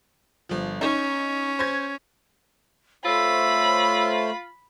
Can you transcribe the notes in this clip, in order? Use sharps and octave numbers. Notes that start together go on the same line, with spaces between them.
G1 F3
C#4 D#4
C5 G#6
A3 F4 C5 C#5 B5 E6